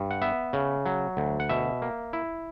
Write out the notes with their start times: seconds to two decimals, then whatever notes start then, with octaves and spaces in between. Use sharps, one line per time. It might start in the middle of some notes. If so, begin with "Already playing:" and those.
Already playing: G2
0.11 F#5
0.22 B3 E5
0.53 C#3
0.86 F#3
1.17 D2
1.40 F#5
1.49 B2 E5
1.82 A#3
2.13 E4